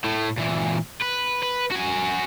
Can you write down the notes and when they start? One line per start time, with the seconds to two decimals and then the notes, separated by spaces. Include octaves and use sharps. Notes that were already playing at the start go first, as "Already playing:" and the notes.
0.04 A2 A3
0.38 A#2 E3
1.01 B4
1.42 B4
1.71 F#4 G#5